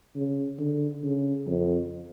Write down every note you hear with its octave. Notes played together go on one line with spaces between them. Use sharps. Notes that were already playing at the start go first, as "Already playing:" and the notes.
C#3
D3
C#3
F2